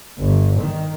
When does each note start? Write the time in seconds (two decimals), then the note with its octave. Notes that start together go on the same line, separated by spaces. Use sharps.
0.20 G1
0.60 D#3